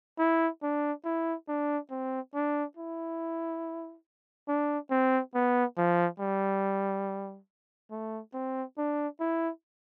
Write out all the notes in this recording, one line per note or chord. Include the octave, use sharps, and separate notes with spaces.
E4
D4
E4
D4
C4
D4
E4
D4
C4
B3
F3
G3
A3
C4
D4
E4